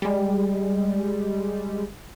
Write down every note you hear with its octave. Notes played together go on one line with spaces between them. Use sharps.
G3 G#3